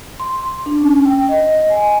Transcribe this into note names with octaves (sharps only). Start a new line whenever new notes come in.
C6
D4
C#4
G5
D#5
G#5